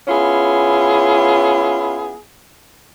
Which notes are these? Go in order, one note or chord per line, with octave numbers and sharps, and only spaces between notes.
B3 C#4 E4 F4 G#4